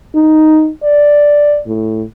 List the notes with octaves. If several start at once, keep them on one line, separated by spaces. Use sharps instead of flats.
D#4
D5
A2